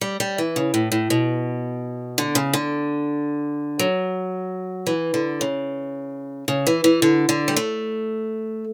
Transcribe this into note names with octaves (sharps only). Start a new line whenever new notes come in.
G3
G3
E3
C#3
A2
A2
B2
D3
C#3
D3
F#3
E3
D3
C#3
C#3
E3
E3
D3
D3
G3
A3